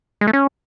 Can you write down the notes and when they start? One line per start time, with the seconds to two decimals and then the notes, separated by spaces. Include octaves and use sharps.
0.21 G#3
0.27 A3
0.33 C#4